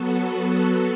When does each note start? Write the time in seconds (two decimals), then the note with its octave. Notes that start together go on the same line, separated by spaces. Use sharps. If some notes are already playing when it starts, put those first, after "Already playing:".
Already playing: F#3 B3 F#4 A4